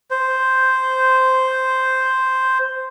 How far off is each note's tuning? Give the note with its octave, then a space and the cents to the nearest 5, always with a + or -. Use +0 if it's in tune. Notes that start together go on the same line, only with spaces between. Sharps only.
C5 -5